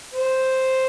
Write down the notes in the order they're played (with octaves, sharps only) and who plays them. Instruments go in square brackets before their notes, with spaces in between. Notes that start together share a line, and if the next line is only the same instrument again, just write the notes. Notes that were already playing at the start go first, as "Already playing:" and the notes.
[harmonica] C5